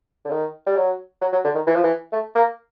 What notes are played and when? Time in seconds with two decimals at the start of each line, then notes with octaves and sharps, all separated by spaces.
0.25 D3
0.30 D#3
0.67 G3
0.76 F#3
1.21 F#3
1.32 F#3
1.44 D3
1.55 D#3
1.67 E3
1.75 F3
1.84 E3
2.12 A3
2.35 A#3